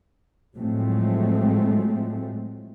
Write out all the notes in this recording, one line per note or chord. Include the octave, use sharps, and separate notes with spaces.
A2 F3 F#3 G#3 A3 C4